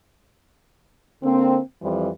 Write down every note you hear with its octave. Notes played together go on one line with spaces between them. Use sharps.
D3 A#3 C4
F2 E3 F3 G3